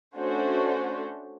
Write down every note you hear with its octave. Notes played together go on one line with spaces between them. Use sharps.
A3 C#4 D4 F#4 C5 C#5